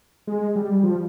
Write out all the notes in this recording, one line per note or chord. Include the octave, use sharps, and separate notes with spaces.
G#3
G3
F3